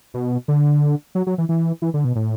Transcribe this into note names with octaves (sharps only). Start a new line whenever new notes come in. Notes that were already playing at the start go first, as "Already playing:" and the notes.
B2
D3
F#3
F#3
E3
E3
E3
D3
B2
A2